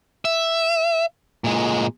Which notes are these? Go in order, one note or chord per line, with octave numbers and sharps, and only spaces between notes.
E5
A#2 G#3